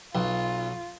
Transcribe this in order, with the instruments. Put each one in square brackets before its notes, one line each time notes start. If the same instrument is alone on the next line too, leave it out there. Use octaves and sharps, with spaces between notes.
[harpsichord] B1 [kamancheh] F4